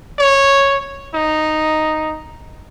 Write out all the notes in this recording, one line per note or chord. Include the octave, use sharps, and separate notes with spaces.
C#5
D#4